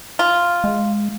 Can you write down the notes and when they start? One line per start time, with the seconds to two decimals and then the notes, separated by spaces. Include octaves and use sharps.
0.19 F4
0.64 G#3